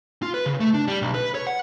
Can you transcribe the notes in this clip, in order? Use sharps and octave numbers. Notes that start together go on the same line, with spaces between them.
F4
B4
C#3
A3
D4
G3
B1
B4
C#5
F#5